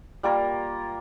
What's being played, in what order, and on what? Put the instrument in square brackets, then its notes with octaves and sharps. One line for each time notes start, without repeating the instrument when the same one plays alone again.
[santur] G3 A#3 F4 A#4